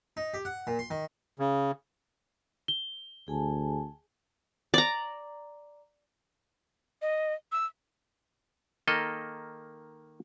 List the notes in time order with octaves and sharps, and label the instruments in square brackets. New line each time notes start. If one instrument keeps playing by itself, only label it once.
[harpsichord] D#4
G4
F#5
A#2
C6
D#3
[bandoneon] C#3
[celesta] G7
[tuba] D2 [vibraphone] G#4 G#5 A5
[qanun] D5 A#5
[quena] D#5
E6
[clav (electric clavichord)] D#3 A#3 A4 D#5